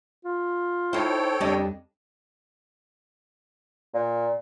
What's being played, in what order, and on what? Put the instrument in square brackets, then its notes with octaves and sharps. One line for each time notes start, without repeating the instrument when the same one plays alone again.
[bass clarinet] F4
[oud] D#4 C5 [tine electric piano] E4 [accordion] A4 C#5 G5
[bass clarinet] F2 [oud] C#3 D4 D#5 [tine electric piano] G3
[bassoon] A#2